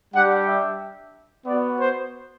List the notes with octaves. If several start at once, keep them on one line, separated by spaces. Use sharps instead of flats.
G3 D4 G4 F#5
E5
B3 F#4 D5
C5